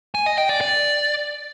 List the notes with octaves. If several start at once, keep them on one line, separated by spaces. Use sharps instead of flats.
G#5
D#5
G5
D5
D5